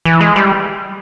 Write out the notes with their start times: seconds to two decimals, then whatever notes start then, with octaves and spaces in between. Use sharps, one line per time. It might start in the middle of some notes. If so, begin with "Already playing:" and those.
0.05 E3
0.21 G#3
0.36 G3